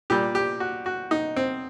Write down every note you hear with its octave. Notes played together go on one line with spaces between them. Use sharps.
A#2 G3 G4
G4
F#4
F#4
D#4
C4